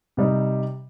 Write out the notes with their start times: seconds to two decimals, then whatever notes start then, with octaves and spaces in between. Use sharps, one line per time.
0.17 C3 G3 D#4